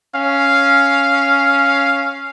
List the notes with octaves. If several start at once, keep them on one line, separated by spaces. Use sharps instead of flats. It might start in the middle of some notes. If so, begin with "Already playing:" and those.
C#4 F5